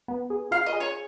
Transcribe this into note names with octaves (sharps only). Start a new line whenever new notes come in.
B3
G#4
F4 F5
D#5
G#4
C#5